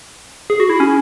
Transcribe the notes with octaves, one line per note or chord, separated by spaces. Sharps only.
G#4
F#4
E4
C#4